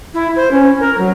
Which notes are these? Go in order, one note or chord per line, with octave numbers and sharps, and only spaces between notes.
E4
C5
C#4
A#4
F#3